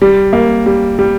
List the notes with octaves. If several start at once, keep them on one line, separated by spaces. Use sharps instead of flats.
G3
A#3
G3
G3